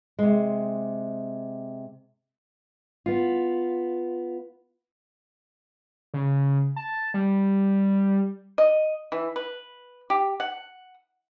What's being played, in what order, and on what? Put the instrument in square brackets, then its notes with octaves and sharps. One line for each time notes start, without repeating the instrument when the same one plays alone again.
[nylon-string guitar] C3 G#3
[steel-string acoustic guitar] B3 F4
[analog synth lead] C#3
A5
G3
[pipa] D#5
E3
B4
G4
F#5